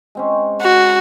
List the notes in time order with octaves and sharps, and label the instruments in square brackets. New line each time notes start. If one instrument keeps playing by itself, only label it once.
[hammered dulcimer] G#3 C4 C#4
[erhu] F#4